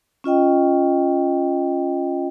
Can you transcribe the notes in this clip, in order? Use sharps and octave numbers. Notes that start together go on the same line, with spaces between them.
C#4 F4 D#5 G5